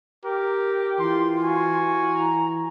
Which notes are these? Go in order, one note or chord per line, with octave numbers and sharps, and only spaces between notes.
G4 A#4
E3 E4 F4 C6
F#4 G#5
A#5